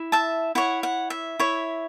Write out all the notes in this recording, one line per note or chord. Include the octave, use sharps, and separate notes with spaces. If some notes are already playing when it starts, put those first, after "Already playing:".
Already playing: E4
E5 A5
E4 C#5 F#5
F#5
E5
E4 C#5